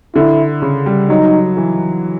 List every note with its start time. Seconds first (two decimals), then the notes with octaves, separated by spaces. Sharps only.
0.15 D3 E4
0.62 C#3
0.86 G3
1.09 F#3 D#4
1.57 E3